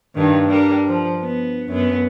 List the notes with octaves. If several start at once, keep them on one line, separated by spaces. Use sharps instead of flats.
G2 D#3
G3 D4 A#4
F3
B3
F#2 B3